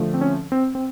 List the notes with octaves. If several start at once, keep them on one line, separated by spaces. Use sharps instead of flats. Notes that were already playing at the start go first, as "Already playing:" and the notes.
Already playing: D3 F3 A3
C4
C#4
C4
C4